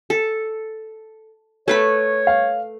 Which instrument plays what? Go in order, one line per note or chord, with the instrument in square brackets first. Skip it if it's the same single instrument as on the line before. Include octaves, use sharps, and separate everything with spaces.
[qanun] A4
[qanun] A3 B4 B5 [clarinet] C#5
[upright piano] F5